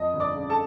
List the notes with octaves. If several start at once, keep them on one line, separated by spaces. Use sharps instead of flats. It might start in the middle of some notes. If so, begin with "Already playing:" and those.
Already playing: F2 D#5 D#6
G1
D5 D6
C#3
A4 A5